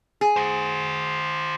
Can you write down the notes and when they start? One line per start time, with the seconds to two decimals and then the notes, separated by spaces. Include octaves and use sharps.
0.21 G#4
0.36 F#4 C5